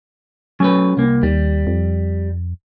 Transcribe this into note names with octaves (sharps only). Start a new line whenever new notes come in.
F#3 A3 C#4 B4
C2 A#3
D#2 G3
F2